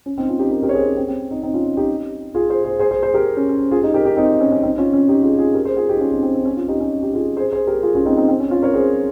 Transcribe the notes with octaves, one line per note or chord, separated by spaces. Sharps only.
C#4
C4 D#4
C#4 F4
D#4 G4
G4 A#4
G4 A#4
C#5
G#4 C5
C#4
C4
C4
C4 D#4
C4 D#4
C#4 F4
D#4 G4
F4 G#4
G#4 C5
G#4 C5
G#4 C5
G#4 C5
G#4 C5
G4 A#4
C#4
C#4
F4 G#4
D#4 G4
G4 A#4
D#4 G4
C4 D#4
C#4
C#4
C4 D#4
C#4 F4
C#4 F4
D#4 G4
F4 G#4
F4 G#4
G4 A#4
G#4 C5
F4 G#4
D#4 G4
C#4 F4
C4 D#4
C4
C4
C#4
C#4 F4
D#4 G4
C#4
D#4 G4
F4 G#4
G#4 C5
G#4 C5
G4 A#4
F4 G#4
C#4 F4
C4 D#4
C4 D#4
C4
C#4
C#4 F4
A#4 C#5
G#4 C5